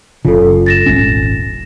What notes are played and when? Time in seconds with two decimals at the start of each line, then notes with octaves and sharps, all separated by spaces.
0.25 F#1 C#3 F4 A4
0.66 A6 A#6 E7
0.86 D#1 G#1 C#4